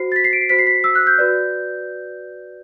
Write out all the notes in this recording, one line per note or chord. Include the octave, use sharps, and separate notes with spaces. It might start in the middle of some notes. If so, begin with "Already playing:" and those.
Already playing: F#4 C5 C7
A6
B6
C7
D7
C7
F#4 C5 B6
C7
B6
E6
F#6
G6
F#4 B4 D5